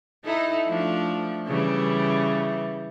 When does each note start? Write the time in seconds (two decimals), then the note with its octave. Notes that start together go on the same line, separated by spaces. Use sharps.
0.25 D#4 E4 A4
0.66 F3 A3 D4
1.46 C#3 E3 G3